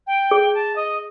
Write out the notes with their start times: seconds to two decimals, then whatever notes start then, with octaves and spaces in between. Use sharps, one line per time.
0.06 G5
0.31 G#4
0.54 A5
0.75 D#5